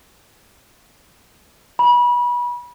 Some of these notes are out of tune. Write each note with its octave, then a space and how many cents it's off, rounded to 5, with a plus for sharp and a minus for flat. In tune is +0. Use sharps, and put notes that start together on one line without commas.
B5 -30